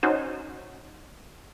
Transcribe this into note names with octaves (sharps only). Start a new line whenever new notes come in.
C#4 D#4 F#4 C5